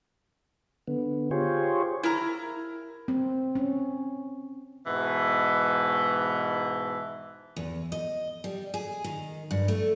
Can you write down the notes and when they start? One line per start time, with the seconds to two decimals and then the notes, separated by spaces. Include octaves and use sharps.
0.88 D3 B3
1.31 F4 G4 G#4 C5 C#5
2.03 E4 A#4 A#5
3.08 C4
3.55 C#4
4.87 G#2 B2 E3
7.57 E2
7.92 D#5
8.44 G3
8.74 G#4
9.04 D#3
9.51 G2
9.68 A3